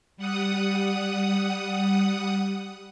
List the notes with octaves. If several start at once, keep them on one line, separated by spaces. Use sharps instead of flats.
G3 F#5 D#6